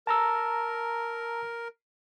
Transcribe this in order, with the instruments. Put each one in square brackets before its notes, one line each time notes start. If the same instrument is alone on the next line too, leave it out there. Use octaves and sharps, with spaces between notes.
[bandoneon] A#4 [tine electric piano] A5 A#5 E6